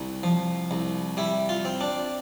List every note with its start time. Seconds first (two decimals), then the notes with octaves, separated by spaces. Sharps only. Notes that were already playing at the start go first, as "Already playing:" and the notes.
Already playing: C2
0.23 F3
0.71 C2
1.17 G3 E4
1.49 F4
1.65 C4
1.81 D4